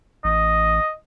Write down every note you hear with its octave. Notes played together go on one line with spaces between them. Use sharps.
A1 D#5